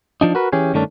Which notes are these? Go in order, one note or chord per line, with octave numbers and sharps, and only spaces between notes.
F3 D4 D#4
F#4 A#4 B4
E3 C#4 G4 G#4
G2 D#3 A3 C#4 D4